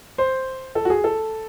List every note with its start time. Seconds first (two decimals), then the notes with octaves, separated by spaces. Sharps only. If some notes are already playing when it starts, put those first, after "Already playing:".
0.18 C5
0.75 A4
0.85 F#4
0.90 G#4
1.04 A4